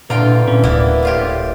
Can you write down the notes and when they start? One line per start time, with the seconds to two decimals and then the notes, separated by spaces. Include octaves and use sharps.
0.10 A#2 D3 E3 F4 G5 A#5
0.47 A#2 C#4
0.63 D1 A#3 B3 E4 D5
1.03 A2 F4 G4